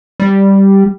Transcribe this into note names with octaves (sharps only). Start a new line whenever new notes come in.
G3